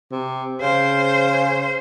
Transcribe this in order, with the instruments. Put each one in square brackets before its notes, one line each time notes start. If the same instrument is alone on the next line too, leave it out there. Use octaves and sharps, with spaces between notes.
[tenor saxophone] C3
[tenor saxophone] C#3 [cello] C5